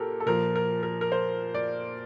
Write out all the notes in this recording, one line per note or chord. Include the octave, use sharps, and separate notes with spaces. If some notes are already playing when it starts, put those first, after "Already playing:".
Already playing: A#2 G4 A4 A#4
A4
A#2 F3 A#4
A#4
A#4
A#4
C5
D5